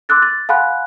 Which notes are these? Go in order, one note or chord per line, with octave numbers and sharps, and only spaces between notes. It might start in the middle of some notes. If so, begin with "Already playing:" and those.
C6 D6 E6 F#6 A6
A6
F5 F#5 G#5 B5 C6 F#6